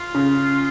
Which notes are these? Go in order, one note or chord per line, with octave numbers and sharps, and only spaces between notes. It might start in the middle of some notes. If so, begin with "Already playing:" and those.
Already playing: F4
C#3